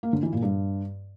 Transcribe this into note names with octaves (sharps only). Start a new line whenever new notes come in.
A#3
D3
E3
A#2
G2